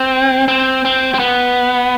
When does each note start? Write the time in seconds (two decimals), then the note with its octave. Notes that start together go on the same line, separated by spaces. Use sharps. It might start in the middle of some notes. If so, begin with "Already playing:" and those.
Already playing: C4
0.48 C4
0.85 C4
1.14 C4
1.19 B3